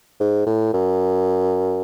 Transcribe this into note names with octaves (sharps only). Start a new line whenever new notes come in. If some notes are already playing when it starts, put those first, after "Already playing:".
G#2
A2
F#2